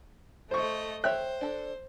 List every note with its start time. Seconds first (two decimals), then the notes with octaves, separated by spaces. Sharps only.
0.51 A3 C5 D#5 C#6
1.04 C5 C#5 E5 G5 F#6
1.41 D4 A4